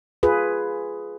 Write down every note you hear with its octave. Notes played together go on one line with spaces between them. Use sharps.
F4 G#4 B4